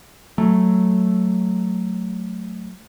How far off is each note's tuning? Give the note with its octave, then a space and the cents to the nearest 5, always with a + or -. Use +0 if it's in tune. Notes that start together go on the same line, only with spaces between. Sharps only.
F#3 +0 A3 +0